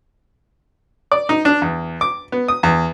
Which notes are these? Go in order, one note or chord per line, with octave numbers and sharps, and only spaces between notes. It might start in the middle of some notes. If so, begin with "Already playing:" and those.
D5
D#4
D4
E2
D6
B3
D#6
E2